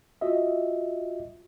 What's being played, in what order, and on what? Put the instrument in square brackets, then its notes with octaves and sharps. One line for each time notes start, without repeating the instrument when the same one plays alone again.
[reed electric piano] F4 F#4 D#5 E5